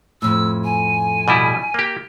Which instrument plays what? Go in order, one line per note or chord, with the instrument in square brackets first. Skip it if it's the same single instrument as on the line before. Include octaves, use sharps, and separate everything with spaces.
[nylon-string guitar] F2 A2 [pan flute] E6
[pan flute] G#5
[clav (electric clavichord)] B2 G3 E4
A#3 G4